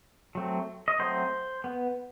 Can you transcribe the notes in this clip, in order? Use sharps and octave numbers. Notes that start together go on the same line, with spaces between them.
F#3 A3 C4
D#5
F#3 A3 C4 C5
B3